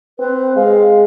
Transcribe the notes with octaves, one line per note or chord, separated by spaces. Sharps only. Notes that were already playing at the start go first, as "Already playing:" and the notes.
C4 B4
G#3 F5